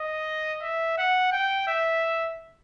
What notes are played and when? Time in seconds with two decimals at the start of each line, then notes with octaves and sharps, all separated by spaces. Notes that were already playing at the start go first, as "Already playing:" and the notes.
Already playing: D#5
0.62 E5
0.98 F#5
1.32 G5
1.68 E5